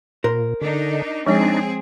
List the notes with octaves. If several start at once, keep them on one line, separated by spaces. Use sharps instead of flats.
A#2 A#4 C5
D3 D4 D#4
F3 G#3 C4 D4 D#4 G#4 C#5